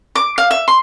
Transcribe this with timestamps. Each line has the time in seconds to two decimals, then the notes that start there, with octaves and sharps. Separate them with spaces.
0.15 D6
0.38 F5
0.51 E5
0.68 C6